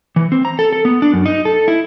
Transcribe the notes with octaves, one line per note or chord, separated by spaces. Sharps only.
E3
C4
A#5
A4
A4
B3
D4
F#2
D#4
A4
E4